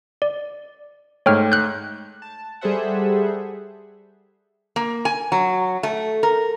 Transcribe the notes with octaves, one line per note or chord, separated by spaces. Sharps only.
D5
G#2 A3 C#5 G5 F6
F#6 G6
A5
G3 G#4 A4 C5 E5 F#5
A#3
G#5
F#3
A3
A#4